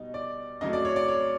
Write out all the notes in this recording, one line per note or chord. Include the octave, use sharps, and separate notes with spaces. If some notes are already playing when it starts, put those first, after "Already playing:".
Already playing: B2 G3 D#4
D5
F2 C#3 F#3 A3 D#4 D#5
D5
C#5
D5
C#5